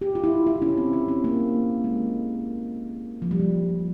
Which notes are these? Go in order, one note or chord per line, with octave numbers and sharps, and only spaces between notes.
G4
F4
E4
E4
C#4
C4
C#4
C4
A#3
G#3
F3
G3
F3